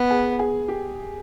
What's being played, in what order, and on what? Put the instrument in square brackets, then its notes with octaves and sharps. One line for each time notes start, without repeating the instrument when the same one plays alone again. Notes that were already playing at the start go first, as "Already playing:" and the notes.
Already playing: [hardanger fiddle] B3
[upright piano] G#4
G#4
G4